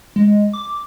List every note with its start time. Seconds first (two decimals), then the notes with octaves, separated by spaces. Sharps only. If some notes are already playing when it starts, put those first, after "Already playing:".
0.16 G#3
0.53 D6